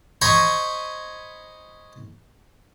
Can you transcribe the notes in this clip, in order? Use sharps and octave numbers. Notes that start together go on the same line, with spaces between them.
C5 D#5 G#5 A#5 B5 C#6